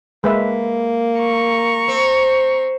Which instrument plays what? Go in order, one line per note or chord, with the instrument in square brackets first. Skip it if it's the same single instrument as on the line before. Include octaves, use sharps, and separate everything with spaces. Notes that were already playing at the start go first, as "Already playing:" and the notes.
[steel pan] G#3 B4 E5 [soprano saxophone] A#3
[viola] A#5 C#6
[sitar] C4